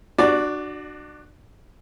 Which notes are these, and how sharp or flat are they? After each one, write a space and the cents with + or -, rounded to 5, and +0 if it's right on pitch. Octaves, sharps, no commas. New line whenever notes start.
D4 +30 F#4 +0 D5 +0